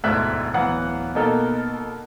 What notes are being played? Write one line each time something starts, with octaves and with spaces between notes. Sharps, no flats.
E1 D2 G#2 A3 E5 F#6
D1 E3 B3 F5 F#5 A#5
B2 A#3 B3 D#4 A4 A#4